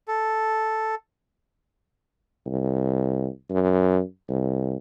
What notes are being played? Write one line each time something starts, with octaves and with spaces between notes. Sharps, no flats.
A4
C2
F#2
C2